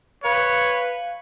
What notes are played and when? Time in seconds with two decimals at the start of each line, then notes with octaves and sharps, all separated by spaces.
0.24 B4 C#5 F5